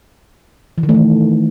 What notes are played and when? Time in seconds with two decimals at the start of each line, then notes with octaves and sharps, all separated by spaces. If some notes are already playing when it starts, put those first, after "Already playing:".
0.78 E3
0.83 D#3
0.89 A3
0.95 E3